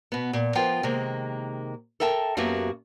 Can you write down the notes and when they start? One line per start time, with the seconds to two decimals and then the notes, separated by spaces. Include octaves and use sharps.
0.12 B2 B3
0.33 A#2
0.55 F3 B3 F4 A#4 G5
0.83 C3 D#3 G#3 A#3
2.00 A4 A#4 E5 G5 A5
2.37 F#2 A#3 B3 F#4 G4 E5